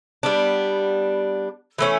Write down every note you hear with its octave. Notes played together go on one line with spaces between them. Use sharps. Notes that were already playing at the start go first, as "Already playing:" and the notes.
G3 B3 D4
E3 A3 C#4